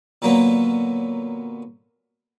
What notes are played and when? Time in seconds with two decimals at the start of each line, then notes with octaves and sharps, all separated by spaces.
0.22 A#2 D3 F#3 A#3 B3